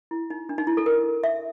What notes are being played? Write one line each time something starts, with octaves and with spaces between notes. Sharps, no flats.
E4
D#4
D4
D#4
E4
A4
A#4
E5